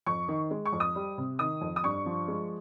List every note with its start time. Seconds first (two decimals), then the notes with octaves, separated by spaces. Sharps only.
0.06 F2 C#6
0.28 D#3
0.51 G#3
0.66 C#6
0.72 F2
0.80 D#6
0.95 G3
1.18 C3
1.39 D#3 D#6
1.61 F2
1.76 D#6
1.84 G2 C#6
2.06 F3
2.28 G#3